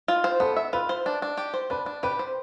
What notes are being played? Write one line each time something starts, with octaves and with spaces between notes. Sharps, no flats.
F4
C5
B3 A4
E5
F4 B4
C5
D4
D4
G4
C5
D4 B4
D4
G4 B4
C5